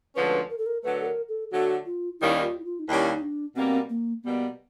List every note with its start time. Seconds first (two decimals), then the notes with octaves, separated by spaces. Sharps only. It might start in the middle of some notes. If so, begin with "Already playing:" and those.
0.16 D2 D3 F3 G#3 C#4 B4
0.50 A#4
0.58 A4
0.66 A#4
0.83 D3 F#3 A3 B4
1.00 A4
1.06 A#4
1.29 A4
1.51 D3 F#3 A3 F#4
1.86 F4
2.19 D#2 D#3 G3 A#3 C#4 E4
2.42 F4
2.60 E4
2.65 F4
2.79 D#4
2.87 D#2 D#3 G3 A#3 C#4 E4
3.14 D#4
3.21 D4
3.55 B2 G3 A#3 C4
3.90 A#3
4.23 B2 G3 A#3 B3